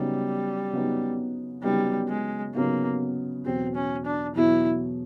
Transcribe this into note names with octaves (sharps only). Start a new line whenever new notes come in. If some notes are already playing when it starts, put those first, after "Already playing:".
Already playing: C#3 F#3 G3 B3 D#4
C#3 F#3 B3 D#4
C#3 F#3 G3 B3 D#4
G#3
C#3 F#3 A#3 B3 D#4
E2 B2 F#3 C4
C#4
D4
E2 B2 F#3 E4